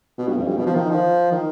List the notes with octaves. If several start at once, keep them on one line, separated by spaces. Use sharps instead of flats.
B2
G2
F2
G2
B2
F3
D#3
F3
D#3